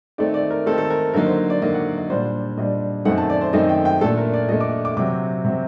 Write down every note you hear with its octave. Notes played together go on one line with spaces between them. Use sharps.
D#3 A3 C4 D#4 D5
D5
A#4
D#3 A3 C4 D#4 A4
A4
A#4
D3 F#3 A#3 D#4 A#4
C5
D5
D3 F#3 A#3 D#4 D#5
F#5
D#5
A#2 G3 D4 C5
A#2 G3 D4 D#5
F#2 D#3 A3 C4 D#4 F#5
A5
D5
C5
F#2 D#3 A3 C4 D#4 D#5
G5
G5
A#2 A3 D4 A4
A#4
D5
A#2 A3 D4 D#5
D6
D6
C3 F#3 C4 D6
C3 F#3 C4